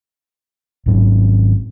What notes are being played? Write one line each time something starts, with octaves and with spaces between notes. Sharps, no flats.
G#1 G#2 F#3 C#4